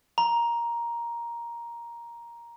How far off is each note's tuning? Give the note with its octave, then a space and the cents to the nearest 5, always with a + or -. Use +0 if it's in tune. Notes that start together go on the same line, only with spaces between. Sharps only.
A#5 +10